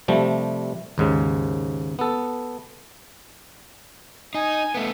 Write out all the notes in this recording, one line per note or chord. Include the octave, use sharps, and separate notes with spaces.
C3 F3 G3 A3
D#2 G#2 C#3
B3 A4
D#4 G#5
A3 B3